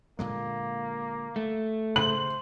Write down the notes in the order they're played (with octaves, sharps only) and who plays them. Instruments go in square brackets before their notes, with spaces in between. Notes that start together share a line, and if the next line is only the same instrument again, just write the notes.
[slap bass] A#2 D3 G#3 [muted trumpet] A#3
[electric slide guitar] A3
[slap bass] C#3 [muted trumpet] C5 [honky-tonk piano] F#7